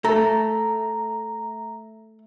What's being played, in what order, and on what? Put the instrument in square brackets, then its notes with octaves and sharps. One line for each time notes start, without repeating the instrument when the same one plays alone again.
[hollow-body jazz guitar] A3 [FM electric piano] A#5